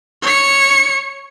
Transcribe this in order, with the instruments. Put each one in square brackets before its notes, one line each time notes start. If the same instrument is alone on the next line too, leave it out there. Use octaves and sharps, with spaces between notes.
[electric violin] C#5 C#7